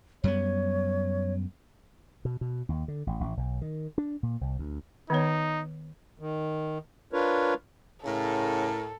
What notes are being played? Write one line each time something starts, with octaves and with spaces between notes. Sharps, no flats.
F#2 G3 B3 C#5
B2
B2
D#2
D3
A1
A1
B1
D#3
D4
A#2
C2
D2
D#3 B3 D#4 C#5
D#3
D4 F4 A#4 B4 C#5
A2 C#3 A4 A#4